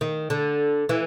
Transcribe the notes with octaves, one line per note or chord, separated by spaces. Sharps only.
D#3
D3
E3